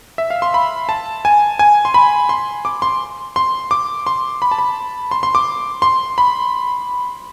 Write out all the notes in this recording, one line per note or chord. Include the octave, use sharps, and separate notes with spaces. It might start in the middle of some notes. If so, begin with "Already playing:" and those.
E5
F5
C6
B5
A5
G#5
G#5
C6
B5
C6
D6
C6
C6
D6
C6
B5
A5
B5
C6
C6
D6
C6
B5